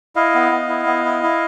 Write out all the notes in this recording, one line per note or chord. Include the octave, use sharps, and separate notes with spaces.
E4 D#5 F5
B3
B3
E4
B3
E4
E4